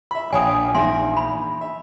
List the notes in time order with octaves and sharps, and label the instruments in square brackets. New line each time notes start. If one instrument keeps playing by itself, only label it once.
[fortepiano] E5 B5
[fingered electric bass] A#1 [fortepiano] C#5 F5 G5 [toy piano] G#5 D#6
[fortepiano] E2 G#2 [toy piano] E5 G#5 C6
[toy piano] B5
[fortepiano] E5